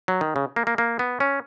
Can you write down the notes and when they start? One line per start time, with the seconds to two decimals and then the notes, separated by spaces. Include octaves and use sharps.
0.08 F#3
0.21 D#3
0.36 C#3
0.56 A#3
0.67 A#3
0.78 A#3
0.99 B3
1.20 C#4